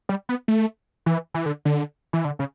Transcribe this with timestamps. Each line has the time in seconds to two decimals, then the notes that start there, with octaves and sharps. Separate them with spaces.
0.09 G3
0.29 B3
0.48 A3
1.06 E3
1.34 E3
1.46 D3
1.65 D3
2.13 E3
2.25 D3
2.39 C#3